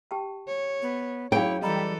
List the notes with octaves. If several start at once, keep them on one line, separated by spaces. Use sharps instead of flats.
G4 G5 A5
C#5
B3
F#2 E4 G#4 C#5 F5 G5
E3 G3 A4 D#5 A#5 B5